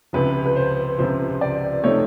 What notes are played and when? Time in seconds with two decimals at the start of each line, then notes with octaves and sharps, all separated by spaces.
0.13 C#2 C3 F3 B4
0.46 B4
0.56 C5
0.98 C#2 C3 F3 C5
1.41 D5
1.83 C3 F3 A3 C4 D#4 C#5